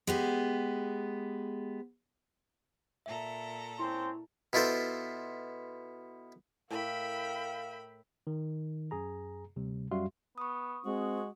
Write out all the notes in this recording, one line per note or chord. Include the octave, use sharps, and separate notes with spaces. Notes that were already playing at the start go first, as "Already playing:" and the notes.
G#3 B3 G4
A#2 A4 E5 A#5
C4 C#4 E4 C6
B2 E4 F4 A4 C5
A2 A#4 E5 F5 G5 B5
D#3
F#2 G#4 A#5
D2 C3 G3
F#2 G3 F#4 E5 F5 C6
B3 C#6 D#6
G#3 C4 F#4